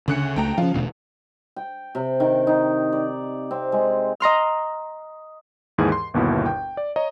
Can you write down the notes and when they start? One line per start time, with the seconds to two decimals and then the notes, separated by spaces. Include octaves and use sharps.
0.08 D2 C#3 F#6 C#7
0.36 C#2 A3 G5 A#5
0.58 C#3 F3 F4
0.74 E1 D2 B2
1.56 G5
1.95 C3
2.20 D#3
2.47 D#4
2.92 D5
3.51 C4
3.72 G#3
4.20 D#5 A#5 C6 F6
5.78 D#2 G#2 E3 G#4
5.92 C6
6.14 G1 D#2 B2 E4
6.46 G5
6.77 D5
6.96 C#5 D#5 A#5